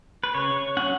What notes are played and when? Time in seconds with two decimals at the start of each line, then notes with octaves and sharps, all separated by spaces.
0.24 B4
0.34 C#3 C#5
0.77 F#3 C#4 F#5